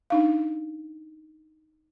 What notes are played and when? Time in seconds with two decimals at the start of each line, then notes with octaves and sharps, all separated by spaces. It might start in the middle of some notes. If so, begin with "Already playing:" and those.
0.10 D4 D#4 F5